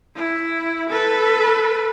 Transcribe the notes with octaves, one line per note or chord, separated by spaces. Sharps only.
E4
A4 B4